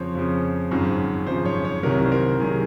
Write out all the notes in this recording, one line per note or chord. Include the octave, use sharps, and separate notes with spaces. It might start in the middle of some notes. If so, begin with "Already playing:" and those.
Already playing: F2 C#3 F3 C5 C#5
F2 C#3 F3
G#1 F#2 C#3 F3
G#1 F#2 C#3 F3 C5
C#5
C#5
C2 C3 D#3 F#3 A#4
C5
A#4
C2 C3 D#3 F#3 G#4